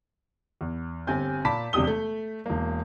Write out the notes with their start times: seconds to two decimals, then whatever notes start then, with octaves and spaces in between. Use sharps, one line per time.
0.61 E2
1.07 G1 C4 G4 G#5 G6
1.45 A#2 A5 B5 D6 B6
1.73 E1 C3 D4 G4 D#6 G7
1.87 A3
2.46 E1 A#3